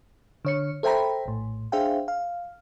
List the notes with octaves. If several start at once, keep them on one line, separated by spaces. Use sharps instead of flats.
D3 C#5 C#7
A4 C5 E5 G5 A#5 B5
A#1 A2
D4 G#4 C5 E5 F5 G5
F5